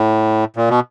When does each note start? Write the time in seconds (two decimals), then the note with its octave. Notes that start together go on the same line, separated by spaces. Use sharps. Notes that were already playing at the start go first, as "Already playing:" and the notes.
Already playing: A2
0.56 A#2
0.70 B2